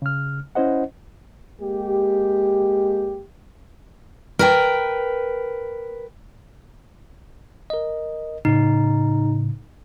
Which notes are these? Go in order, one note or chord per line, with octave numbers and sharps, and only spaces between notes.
C#3 F6
C#4 E4 C5 D#5 F#5
G#3 A#3 G4
A#4 B4 G5
A#4 D#5
A2 C#3 D#4